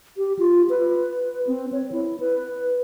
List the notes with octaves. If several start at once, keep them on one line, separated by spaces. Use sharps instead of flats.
G4
F4
B4
C4
C#5
E4
B4